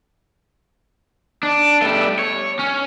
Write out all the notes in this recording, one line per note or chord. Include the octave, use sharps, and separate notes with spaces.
D4
G3 A3
C#5
C#4